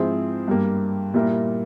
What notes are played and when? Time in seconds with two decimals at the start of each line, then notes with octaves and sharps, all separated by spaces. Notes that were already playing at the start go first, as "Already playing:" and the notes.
Already playing: G#2 F3 C4 E4 G#4
0.48 G2 G3 A#3
1.14 A#2 G3 A#3 E4 A#4